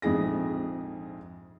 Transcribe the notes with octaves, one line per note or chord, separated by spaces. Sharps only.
A#1 F2 G#2 G#4 A#6